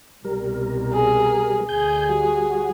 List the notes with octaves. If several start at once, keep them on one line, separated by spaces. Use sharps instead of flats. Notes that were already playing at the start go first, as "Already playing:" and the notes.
C2 B2 G3 A#4
G#4
D2 G#4 G#5 G6
G3 F#4